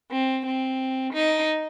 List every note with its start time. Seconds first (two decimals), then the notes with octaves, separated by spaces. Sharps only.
0.11 C4
0.46 C4
1.13 D#4